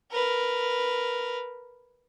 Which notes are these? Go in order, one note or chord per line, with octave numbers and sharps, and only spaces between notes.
A#4 B4